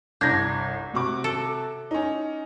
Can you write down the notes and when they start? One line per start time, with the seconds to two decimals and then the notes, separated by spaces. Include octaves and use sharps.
0.21 G1 C2 D4 G6 G#6 A#6
0.94 C3 F#4 D6
1.24 A4
1.91 C#4 D#4